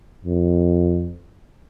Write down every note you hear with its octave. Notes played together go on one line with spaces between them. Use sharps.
F2